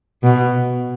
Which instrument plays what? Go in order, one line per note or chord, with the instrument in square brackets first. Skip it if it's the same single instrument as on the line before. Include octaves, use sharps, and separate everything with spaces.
[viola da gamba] B2